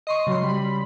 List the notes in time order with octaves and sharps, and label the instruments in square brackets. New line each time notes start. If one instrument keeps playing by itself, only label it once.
[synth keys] D#5 C6 C#6
[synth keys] C#3 C6 [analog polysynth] F#3
[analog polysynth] G3 B5